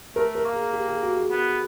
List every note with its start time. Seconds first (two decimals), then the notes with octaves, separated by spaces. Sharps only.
0.15 A3 A#4
0.35 A#4
0.44 A#3
0.54 G#4
0.73 G4
0.88 G#4
1.03 F#4
1.17 G#4
1.31 B3